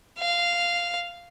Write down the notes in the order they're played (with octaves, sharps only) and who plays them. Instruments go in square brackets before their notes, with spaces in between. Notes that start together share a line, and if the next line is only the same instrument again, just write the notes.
[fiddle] F5